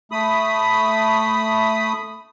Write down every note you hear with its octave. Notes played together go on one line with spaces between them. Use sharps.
A3 B5 D#6